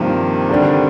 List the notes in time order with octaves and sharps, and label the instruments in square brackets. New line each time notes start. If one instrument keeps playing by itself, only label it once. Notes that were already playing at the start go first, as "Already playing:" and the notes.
Already playing: [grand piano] G2 F3 A#3 [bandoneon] C3 D#3
[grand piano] D3 G3 D4